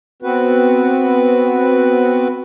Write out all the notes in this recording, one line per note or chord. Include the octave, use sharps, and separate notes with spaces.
B3 C4 F#4 B4